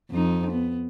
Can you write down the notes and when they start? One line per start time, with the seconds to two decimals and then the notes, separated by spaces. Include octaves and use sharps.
0.11 F2 D#4
0.51 B3